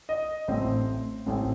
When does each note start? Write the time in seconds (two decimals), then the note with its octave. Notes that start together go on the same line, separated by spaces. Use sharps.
0.09 D#5
0.48 A1 A2 A3 C4 C5
1.26 A1 A2 A3 C4